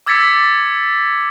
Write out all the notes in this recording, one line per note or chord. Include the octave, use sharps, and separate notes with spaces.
D6 E6 G#6 A6 B6 C#7